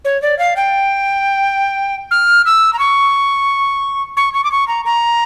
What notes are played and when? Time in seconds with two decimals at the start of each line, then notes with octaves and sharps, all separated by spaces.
0.05 C#5
0.22 D5
0.39 F5
0.56 G5
2.11 F6
2.46 E6
2.73 A#5
2.79 C#6
4.17 C#6
4.34 C#6
4.44 D6
4.52 C#6
4.68 A#5
4.85 A#5